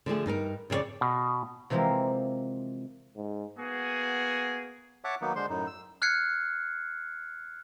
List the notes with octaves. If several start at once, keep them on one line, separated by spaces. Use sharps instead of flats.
D3 F3 A3 G#4
G2 D#4 A4 A#4
F2 C#3 C#4 C#5 D5
B2
C3 E3 F3 G#3 A#3 C4
G#2
A#3 B3 F#4 G#4
C#5 E5 F#5 A5 D6
D#3 F#3 A#3 B3 D#4
D3 G#3 C5 C6
F#2 A2 D#4
E6
F6 F#6 G#6 C7 C#7